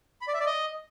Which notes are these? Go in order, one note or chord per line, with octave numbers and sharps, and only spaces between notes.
B5
D5
E5
D5
D#5